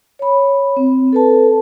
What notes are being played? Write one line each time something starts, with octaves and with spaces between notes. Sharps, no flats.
C#5 B5
C4
A4 B4 A5